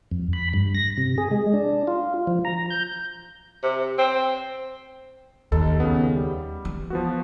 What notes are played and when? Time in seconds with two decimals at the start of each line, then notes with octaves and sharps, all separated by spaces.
0.11 F2
0.33 B5
0.54 G2
0.75 A#6
0.97 C3
1.18 G#4
1.31 G#3
1.53 D4
1.87 F4
2.27 F3
2.45 A#5
2.70 G6
3.63 C3
3.98 C4
5.52 D#2 A4
5.80 C#3 B3
6.16 G3
6.65 E3
6.90 F3 B3 F#4